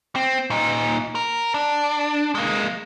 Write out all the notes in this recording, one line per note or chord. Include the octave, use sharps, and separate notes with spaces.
C4
A#2 D#4
A#4
D4
G#3 A#3